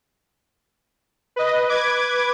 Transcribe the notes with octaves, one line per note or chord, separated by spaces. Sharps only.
B4 D#5
B4 D6 G#6